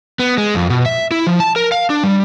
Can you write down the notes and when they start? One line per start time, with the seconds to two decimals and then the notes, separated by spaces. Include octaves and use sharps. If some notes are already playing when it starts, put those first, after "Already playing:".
0.19 B3
0.38 G#3
0.55 F2
0.70 B2
0.86 E5
1.11 E4
1.27 F3
1.40 A5
1.56 A#4
1.72 F5
1.90 D4
2.04 G3